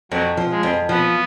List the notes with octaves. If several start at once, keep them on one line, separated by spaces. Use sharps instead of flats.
F2 F#3
F3
G#3
F2
F3 B3